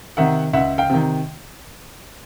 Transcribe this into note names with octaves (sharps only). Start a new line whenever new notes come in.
C3 D#3 E5 F#5
C#2 E5 F#5
F5 G5
C3 D#3